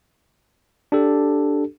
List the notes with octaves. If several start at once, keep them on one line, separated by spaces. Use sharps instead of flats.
D4 G4 A4